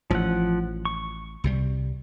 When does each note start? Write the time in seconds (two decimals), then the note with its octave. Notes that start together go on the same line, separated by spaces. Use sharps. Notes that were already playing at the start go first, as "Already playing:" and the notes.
0.11 A1 F3 F#5
0.85 C#6
1.44 C2 C3 G3